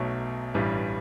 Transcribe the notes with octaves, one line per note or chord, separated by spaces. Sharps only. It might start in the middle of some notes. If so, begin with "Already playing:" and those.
Already playing: B1 B2 F#3 A3
A1 G2 E3 G3